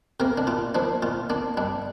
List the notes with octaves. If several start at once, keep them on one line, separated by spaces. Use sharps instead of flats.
C3 A#3 A#4
D4
A#2 F4
F3 A#3 D4
A#2 F4
A#3 D4
G2 D4